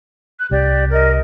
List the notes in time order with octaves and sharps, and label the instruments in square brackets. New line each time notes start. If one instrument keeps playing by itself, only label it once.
[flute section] F#6
[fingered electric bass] C2 [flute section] G4 D5
[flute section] A#4 D#5